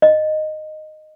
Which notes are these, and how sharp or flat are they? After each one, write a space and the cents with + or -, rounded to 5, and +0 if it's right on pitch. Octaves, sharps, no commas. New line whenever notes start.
D#5 -10